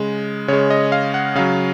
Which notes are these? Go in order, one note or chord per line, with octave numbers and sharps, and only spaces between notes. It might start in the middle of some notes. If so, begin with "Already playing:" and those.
Already playing: C#3 G#3
C#3 G#3 C#5
D#5
F5
F#5
C#3 F#3 F5